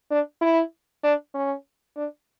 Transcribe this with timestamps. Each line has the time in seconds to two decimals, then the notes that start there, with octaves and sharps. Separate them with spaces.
0.11 D4
0.41 E4
1.04 D4
1.34 C#4
1.97 D4